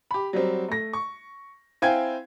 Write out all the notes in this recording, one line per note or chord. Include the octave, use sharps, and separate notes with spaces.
G4 B5
F#3 G3 C4
A3 A#6
C#6
C4 E4 F5 G5 G#5 G#6